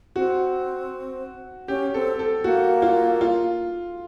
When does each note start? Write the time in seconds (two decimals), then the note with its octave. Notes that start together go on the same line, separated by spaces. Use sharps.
0.16 C4 F#4
1.68 C#4 G4
1.94 C4 A4
2.19 A4
2.44 A#3 F#4
2.82 F4
3.21 F4